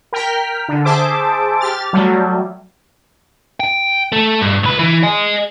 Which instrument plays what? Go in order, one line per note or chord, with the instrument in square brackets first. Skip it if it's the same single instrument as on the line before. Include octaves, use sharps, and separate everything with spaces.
[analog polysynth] A#4 G5 F6 B6
D3
G#4 C5 E5 A5 D6
G4 F6 A6
F#3 G3 A3
[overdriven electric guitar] G5
A3
G2
C#2 B4
E3
D#5 G#5